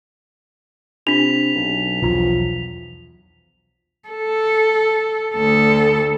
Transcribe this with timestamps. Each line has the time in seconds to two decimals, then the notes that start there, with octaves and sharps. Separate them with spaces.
1.07 C3 D4 F4 B6 F7
1.55 B1
2.02 B1 E2 F3 F#3
4.09 A4
5.34 D2 A4